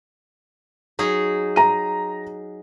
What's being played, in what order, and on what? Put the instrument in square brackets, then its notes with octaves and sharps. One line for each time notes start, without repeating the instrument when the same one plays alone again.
[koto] F#3 D#4 G#4
[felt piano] A#5 D#7